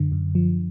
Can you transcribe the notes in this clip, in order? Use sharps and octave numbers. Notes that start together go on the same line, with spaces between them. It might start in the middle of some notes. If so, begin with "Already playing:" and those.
Already playing: F#2 D3
F#2
F3